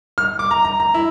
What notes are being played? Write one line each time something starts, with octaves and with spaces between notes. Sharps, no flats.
F6
D6
A#5
A#5
A#5
E4